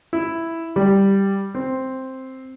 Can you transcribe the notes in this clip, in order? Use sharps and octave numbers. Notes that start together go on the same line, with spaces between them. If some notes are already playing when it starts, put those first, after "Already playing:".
E4
G3
C4